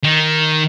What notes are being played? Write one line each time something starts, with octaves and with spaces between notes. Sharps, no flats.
D#3